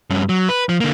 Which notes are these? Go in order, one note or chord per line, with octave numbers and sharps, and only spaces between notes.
G2 C#4
F#3
B4
F3
D3 A#3